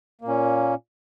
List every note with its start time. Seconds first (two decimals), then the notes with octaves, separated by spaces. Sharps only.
0.21 A#3
0.25 A#2
0.28 C#4